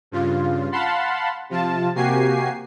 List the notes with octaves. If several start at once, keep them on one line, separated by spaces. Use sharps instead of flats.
G2 C#3 F4
F5 F#5 A5 B5 C6
C3 F3 F4 A5
C3 A#3 F#4 G4 G#5 C7